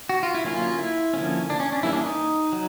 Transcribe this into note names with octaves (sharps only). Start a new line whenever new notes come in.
F#4
F4
E4
D3 F#3 A#3 C#4 F4
E4
D3 F3 A#3 C#4
D4
C#4
D4
E3 G3 A#3 C#4 E4
D4
D#4
F#3